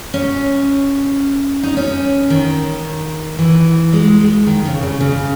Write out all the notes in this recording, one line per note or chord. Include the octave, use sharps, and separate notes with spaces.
C#4
D#4
C#4
D#3
E3
G#3
G#3
D#3
C#3
C#3
C#3